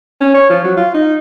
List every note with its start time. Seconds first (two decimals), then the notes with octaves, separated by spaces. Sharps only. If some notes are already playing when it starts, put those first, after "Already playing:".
0.21 C#4
0.34 C#5
0.50 F3
0.64 F#3
0.77 F4
0.94 D#4